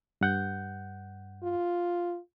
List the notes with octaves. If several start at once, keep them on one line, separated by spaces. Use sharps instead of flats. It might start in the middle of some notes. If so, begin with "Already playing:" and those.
G2 F#5 G6
F4